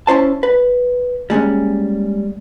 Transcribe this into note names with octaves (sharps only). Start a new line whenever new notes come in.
C#4 E4 C5 A5
B4
G3 G#3 A#3 C#4